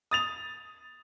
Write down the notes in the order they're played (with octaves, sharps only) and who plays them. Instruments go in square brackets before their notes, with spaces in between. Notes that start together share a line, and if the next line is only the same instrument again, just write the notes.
[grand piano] D#6 A6 F7